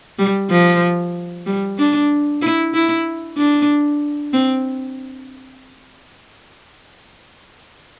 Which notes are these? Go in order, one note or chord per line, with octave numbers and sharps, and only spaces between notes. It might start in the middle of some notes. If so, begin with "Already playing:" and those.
G3
F3
G3
D4
E4
E4
D4
C4